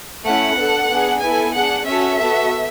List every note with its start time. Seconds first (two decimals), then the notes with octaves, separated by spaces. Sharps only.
0.24 A3 C#4 E4 F#5
0.57 B3 D4 A4
0.89 B3 D4 G#4
1.22 B3 E4 A4 G#5
1.54 D4 G#4 F#5
1.87 C#4 F#4 A4 E5
2.19 B3 F#4 A4